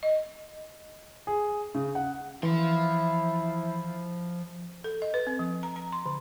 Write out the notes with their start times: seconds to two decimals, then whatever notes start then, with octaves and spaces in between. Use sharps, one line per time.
0.03 D#5
1.27 G#4
1.75 C#3
1.95 F#5
2.43 E3 F3 E4 C6
4.84 A4
5.02 D#5
5.14 B4
5.27 C4
5.39 F3
5.63 A#5
5.76 A#5
5.92 C6
6.06 D3